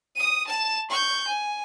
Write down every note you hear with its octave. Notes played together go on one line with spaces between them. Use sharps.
D#6 D#7
A5 E7
C#6 G6
G#5